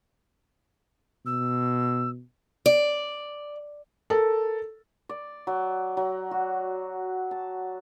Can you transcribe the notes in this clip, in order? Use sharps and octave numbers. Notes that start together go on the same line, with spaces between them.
B2 E6
D5
A4 A#4
D5
F#3
F#3
F#4
A5